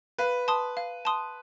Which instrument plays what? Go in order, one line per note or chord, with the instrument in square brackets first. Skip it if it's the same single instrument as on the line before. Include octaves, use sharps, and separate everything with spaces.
[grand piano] B4 [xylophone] F5
[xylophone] A5 C6 D#6
F5
A5 C6 D#6